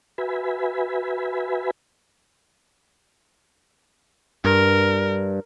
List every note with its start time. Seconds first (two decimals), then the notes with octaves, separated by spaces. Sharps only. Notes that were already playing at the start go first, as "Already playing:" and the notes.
0.18 F#4 B4 E5 G#5 B5
4.45 G2 A#4